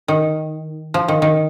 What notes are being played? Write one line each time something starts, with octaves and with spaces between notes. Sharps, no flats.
D#3
F3
D#3
D#3